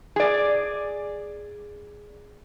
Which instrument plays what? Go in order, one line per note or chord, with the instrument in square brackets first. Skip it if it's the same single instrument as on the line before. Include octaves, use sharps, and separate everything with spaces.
[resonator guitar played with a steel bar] G#4 D5